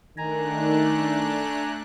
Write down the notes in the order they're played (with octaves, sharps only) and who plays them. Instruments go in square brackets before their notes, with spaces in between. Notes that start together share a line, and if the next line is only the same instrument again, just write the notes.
[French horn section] D#3 [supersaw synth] A3 D4 F#6 [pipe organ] G#5 A#5